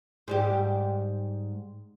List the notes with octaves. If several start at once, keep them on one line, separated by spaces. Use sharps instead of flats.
G#2 G3 G4